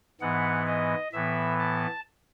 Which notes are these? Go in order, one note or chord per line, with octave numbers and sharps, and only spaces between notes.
G#2 E3 B3 F#5
D#5
A2 E3 B3 E5
A5